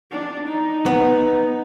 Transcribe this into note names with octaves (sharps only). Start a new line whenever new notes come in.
D4
D#4
B3